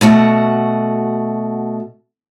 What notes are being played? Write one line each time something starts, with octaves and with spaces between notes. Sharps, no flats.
B2 A3 F#4 F#5